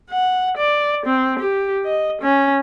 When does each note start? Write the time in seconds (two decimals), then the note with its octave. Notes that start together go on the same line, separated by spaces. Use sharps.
0.10 F#5
0.57 D5
1.06 C4
1.39 G4
1.85 D#5
2.22 C#4